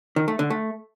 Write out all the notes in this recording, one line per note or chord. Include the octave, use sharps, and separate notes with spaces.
D#3
A3
D3
A3